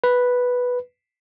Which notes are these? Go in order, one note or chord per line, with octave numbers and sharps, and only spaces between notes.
B4